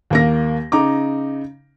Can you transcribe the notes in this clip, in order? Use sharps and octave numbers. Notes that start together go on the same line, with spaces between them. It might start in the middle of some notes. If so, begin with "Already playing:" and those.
D#2 A#3 A#6
C#3 D#4 A#5 D6